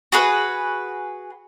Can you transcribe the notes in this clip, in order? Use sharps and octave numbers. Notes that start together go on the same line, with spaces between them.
F#4 G#4 B4